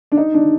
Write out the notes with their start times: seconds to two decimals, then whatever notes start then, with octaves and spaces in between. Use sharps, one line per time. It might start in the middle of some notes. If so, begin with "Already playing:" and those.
0.12 D4
0.17 D#4
0.34 D4